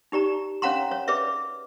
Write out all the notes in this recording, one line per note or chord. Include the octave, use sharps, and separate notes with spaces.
D#4 G4 D5 A#5
C#4 C#5 F5 F#5 A#5 C6
C#5
G#4 B4 D5 E5